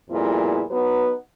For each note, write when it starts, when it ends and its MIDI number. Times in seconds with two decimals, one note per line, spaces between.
0.11 0.62 41
0.11 0.62 46
0.11 0.62 55
0.11 0.62 59
0.11 0.62 64
0.11 0.62 68
0.71 1.13 54
0.71 1.13 59
0.71 1.13 63
0.71 1.13 71